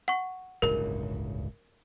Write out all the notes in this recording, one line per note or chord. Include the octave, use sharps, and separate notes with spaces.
F#5 C#6
D1 G1 C#2 A#4